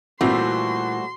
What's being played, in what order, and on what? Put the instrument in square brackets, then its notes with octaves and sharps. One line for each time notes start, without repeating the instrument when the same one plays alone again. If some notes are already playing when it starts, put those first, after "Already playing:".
[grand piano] A#2 E3 [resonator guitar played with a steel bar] G3 A3 C4 [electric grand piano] F#4 [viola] C6